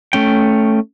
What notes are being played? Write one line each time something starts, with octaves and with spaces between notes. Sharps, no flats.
A3 C#4 G5